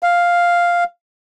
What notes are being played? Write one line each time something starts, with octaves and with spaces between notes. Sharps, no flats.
F5